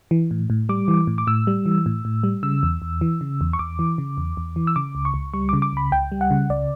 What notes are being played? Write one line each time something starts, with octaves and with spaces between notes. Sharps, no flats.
E3
A2
A2
G3 D6
E3
A2
D6
A2 E6
G3
E3
A2
A2
G3
C#3 E6
E2
E2
E3
C#3
E2
C#6
E2 D6
E3
C#3
E2
E2
E3
E6
C#3 D6
C#2
C#6
C#2
G3 C#6
D6
C#3
D6
C#2 B5
C#2 G5
G3
F#5
C#3
C#2 D5